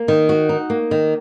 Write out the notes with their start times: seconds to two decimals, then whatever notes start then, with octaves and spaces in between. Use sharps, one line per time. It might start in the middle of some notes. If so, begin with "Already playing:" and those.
Already playing: A#3
0.08 D#3
0.29 F#4
0.49 D#4
0.70 A#3
0.91 D#3